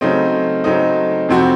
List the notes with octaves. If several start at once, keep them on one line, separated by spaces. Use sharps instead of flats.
C#3 F#3 A3 C4 D#4
C#3 F#3 A3 C4 D#4
F2 C3 F3 C4 F#4